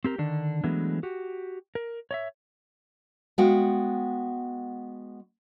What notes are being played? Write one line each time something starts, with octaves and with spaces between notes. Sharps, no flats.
C4 G4 A#4
D3 D#3 D4
E3 F#3 G#3 A3 B3 D4
F#4 G4
A#4
C#5 D#5 E5
G#3 B3 F#4 F5 G5